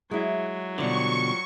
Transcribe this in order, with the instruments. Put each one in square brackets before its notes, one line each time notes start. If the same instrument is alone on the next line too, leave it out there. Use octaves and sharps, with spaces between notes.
[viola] F#3 [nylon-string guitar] G#3 E4
[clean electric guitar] B2 D3 [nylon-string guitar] F3 G3 [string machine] C#6